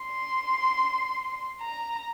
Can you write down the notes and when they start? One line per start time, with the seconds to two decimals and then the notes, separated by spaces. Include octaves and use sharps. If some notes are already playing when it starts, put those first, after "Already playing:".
Already playing: C6
1.61 A#5